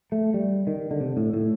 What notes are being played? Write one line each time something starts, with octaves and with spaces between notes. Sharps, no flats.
A3
G3
D#3
D3
C3
A2
A2